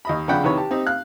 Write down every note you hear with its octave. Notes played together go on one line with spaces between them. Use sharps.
D#2 D#5 B5
F2 C#3 D4 F#5 G5 B5
C3 D#3 E3 B4 C#5
G4 A5
C4 D#4 G4
F5 F#6